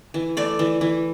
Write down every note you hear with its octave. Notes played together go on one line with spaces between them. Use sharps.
E3
A3 D5
E3
E3